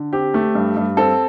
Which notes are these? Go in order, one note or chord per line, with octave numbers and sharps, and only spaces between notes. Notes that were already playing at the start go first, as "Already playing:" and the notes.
Already playing: D3
C4 G4
A3
G2
G2
C4 A4